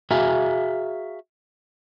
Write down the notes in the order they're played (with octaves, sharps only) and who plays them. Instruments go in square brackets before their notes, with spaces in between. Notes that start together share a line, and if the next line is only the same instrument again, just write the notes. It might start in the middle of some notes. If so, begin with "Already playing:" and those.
[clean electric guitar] F#4 G#4 E5 F5 G#5 A#5